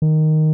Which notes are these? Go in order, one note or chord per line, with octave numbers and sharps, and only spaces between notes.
D#3